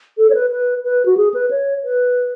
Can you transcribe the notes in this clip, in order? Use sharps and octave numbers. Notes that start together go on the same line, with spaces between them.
A4
C#5
B4
B4
B4
F#4
G#4
B4
C#5
B4